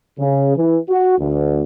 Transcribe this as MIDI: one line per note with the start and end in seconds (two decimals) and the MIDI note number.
0.18 0.55 49
0.57 0.78 52
0.89 1.16 66
1.19 1.63 38